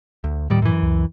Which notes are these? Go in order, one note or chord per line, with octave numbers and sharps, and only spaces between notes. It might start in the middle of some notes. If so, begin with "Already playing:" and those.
D2
D#1 A2 D#3 G3
F#2 E3
C#2